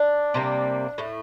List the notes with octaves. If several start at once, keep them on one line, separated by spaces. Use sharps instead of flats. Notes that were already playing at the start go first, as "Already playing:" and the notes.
Already playing: D4
C3 G3 A#3
A2 A3